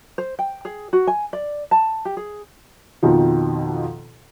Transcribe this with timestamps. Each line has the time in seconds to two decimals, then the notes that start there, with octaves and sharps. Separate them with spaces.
0.18 C5
0.39 G5
0.65 G#4
0.93 F#4
1.07 G#5
1.33 D5
1.71 A5
2.05 G4
2.17 G#4
3.03 F2 B2 D#3 F3